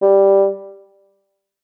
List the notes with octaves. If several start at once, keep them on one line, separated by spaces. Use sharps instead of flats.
G3